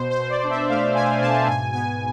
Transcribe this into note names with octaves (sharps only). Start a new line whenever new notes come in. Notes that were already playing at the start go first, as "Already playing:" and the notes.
Already playing: B2 C5
C5
B2
D5
D4
E5
A3 F5
B2 G#5
B2 A5
G#2 G#5
B3 G#5